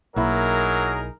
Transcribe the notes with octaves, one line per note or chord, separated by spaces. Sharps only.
B1 F#3 A#3 D#4 E4 G#4 A#4